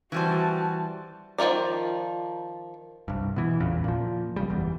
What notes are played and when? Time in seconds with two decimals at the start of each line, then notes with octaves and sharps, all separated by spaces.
0.12 E3 G3 F#4 C5 A5
1.38 D#3 F3 F4 A#4 D5
3.08 C2 G2
3.36 B2 E3
3.60 A1 E2 A#2 C#3
3.84 A#2 F3
4.36 B1 C#3 G3
4.50 F#1 E2